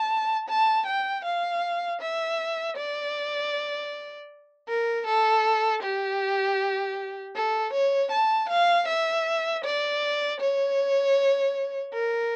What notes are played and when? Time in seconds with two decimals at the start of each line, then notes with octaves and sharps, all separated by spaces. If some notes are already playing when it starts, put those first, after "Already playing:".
Already playing: A5
0.49 A5
0.87 G5
1.25 F5
2.01 E5
2.77 D5
4.68 A#4
5.06 A4
5.83 G4
7.36 A4
7.73 C#5
8.11 A5
8.49 F5
8.88 E5
9.65 D5
10.41 C#5
11.94 A#4